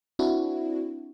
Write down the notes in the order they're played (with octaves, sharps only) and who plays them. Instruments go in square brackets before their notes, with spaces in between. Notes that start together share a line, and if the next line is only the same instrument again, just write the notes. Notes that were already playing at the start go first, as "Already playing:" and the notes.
[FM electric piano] C4 D4 E4 F#4